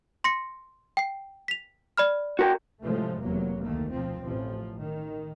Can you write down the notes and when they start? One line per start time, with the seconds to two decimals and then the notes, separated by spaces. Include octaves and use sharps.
0.24 C6 A#6 C#7
0.97 G5 C7
1.48 B6 F7
1.97 D5 B5 F6
2.39 F#4 A#4 G5
2.83 A2 C3 F3 G#3 A3
3.21 F1 E2 C3 F#3 A#3
3.63 D2 D#3 A3 A#3
3.92 B2 F3 C4
4.23 A1 F3
4.78 D#3